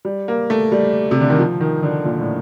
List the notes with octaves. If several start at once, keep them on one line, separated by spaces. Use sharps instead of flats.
G3
A#3
A3
G3
C3
D3
D#3
F3
D#3
D3
A#2
A2